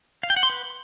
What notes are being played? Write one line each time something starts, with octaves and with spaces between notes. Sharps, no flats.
F5
G5
F#5
C6
B4